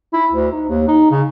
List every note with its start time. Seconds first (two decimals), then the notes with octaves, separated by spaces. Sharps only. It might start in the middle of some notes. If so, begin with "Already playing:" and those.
0.14 E4
0.33 D2
0.52 D#4
0.69 D#2
0.88 D#4
1.11 C#3